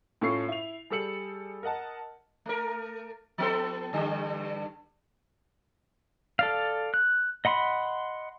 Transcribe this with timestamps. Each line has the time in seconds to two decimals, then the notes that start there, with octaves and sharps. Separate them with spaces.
0.21 A2 C#4 F4 A4 C#6 C7
0.48 E4 F7
0.90 G3 G#4 A4 E6 C#7 F#7
1.63 A#4 D#5 F#5 A5
2.46 A3 A#4
3.38 F3 B3 A4
3.93 G2 D3 G3
6.39 A4 D5 F5
6.94 F#6
7.45 D#5 F#5 B5 C6